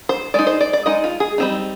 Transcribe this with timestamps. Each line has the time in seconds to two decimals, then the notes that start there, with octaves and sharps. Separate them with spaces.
0.09 C5
0.34 G#3 D#4 D5
0.47 C5
0.61 D5
0.73 D5
0.86 G#3 D#4 D#5
1.04 F4
1.20 G#4
1.38 G3 C4 D#4